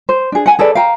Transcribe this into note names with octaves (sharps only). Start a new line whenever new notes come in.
C5
D4 G#4
F#5 G#5
G#4 A4 B4 D5
F5 G5 A#5